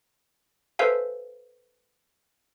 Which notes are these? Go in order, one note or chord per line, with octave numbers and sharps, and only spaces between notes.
A4 B4 C5 E5 F5 G#5